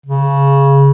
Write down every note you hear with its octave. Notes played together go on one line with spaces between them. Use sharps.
C#3